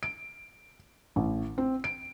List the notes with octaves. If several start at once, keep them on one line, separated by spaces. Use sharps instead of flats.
D7
A1
C4
D7